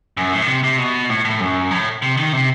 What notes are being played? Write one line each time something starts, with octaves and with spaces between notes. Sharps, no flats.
F#2
A2
D#3
C3
C3
B2
A2
A2
F#2
A2
C3
D#3
C3